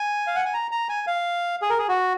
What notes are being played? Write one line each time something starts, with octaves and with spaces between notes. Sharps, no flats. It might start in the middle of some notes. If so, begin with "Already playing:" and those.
Already playing: G#5
F5
F#5
G#5
A#5
A#5
G#5
F5
G#4
A#4
G#4
F#4